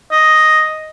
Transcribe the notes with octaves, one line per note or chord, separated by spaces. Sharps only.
D#5